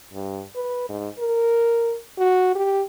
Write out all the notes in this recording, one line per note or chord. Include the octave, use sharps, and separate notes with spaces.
G2
B4
G#2
A#4
F#4
G4